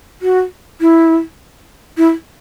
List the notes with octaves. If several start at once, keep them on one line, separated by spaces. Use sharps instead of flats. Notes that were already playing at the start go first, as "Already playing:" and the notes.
F#4
E4
E4